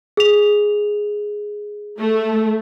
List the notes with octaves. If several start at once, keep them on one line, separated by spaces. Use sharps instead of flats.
G#4 F7
A3